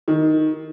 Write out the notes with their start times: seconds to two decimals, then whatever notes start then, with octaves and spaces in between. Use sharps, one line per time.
0.08 D#3